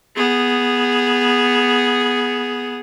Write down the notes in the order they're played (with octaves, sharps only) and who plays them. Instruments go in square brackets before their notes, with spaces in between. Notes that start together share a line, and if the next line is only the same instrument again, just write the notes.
[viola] B3 G#4